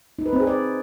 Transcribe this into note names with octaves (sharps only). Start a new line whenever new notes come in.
D#4
B4
C4
G#4
D5